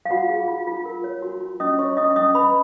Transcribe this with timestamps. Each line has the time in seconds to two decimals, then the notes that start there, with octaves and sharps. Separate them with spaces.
0.05 F5
0.10 F4 F#4 F#5
0.29 G#4
0.48 F4
0.67 F4
0.85 A#4
1.04 C#5
1.22 F#4
1.41 F#4
1.60 C#4 D#5 D#6
1.79 C#4 C#5 C#6
1.97 C#4 D#5 D#6
2.16 C#4 D#5 D#6
2.35 B4 B5